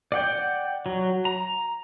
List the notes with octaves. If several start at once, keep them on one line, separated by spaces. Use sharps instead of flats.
D5 F#5 G5
F#3
A#5